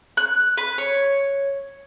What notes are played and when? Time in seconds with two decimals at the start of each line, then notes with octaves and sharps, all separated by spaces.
0.17 F#6
0.57 B4
0.78 C#5